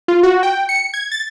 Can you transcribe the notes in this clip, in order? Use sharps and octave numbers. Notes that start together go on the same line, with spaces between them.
F4
F#4
G5
C#7
G#6
A6